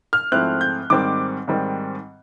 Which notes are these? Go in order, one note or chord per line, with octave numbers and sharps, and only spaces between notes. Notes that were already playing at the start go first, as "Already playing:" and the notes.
F6
G#2 F3 A3 C4 E4 F#6
G6
G#2 D#3 G3 C4 D6
G#2 D#3 G3 C4